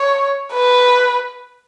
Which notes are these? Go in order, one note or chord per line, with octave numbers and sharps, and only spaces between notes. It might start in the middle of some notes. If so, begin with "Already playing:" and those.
Already playing: C#5
B4